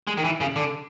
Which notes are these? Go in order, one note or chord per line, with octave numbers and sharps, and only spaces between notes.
G#3
D#3
E3
C#3
D3